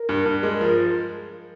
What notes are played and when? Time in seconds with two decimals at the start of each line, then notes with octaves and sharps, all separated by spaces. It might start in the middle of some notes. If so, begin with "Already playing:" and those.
Already playing: A#4
0.09 G2
0.26 G2
0.43 G#3
0.60 F3 A#4